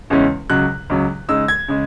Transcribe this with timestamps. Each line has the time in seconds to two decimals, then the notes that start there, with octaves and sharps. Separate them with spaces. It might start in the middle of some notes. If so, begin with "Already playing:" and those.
0.10 E2 C#3 G#3 C#4 E4
0.50 C#2 C#3 F#3 F#6
0.90 C#2 C#3 F#3
1.29 C#3 G#3 D#4 E6
1.48 G#6
1.68 C#3 G#3